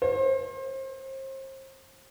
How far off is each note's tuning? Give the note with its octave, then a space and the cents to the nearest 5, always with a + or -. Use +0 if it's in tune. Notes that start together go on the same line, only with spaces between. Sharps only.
C5 +35